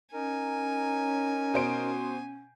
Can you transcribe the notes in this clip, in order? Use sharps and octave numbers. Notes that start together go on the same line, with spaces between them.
C#4 D#4 A#4 G#5
B2 C5 D7